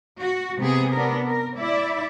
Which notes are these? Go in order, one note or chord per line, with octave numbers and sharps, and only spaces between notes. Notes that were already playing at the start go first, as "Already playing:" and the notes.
F#4
C3 B3 G#4
B3 D4 A#4
A#4
E4 D5 E5